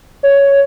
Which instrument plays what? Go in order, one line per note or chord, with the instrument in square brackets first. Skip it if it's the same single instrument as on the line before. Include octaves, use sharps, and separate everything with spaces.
[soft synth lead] C#5